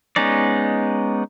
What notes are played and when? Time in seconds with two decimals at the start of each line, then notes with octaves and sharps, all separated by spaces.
0.16 G#3 B3 C#4 D#4 D5